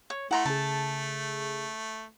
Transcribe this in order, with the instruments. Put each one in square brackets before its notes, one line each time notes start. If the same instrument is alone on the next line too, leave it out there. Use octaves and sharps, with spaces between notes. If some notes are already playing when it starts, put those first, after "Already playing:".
[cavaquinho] C#5
[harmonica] A3 [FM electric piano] E4 [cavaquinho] F#5 A#5 C6
[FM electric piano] C#3 G#4 [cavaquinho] A5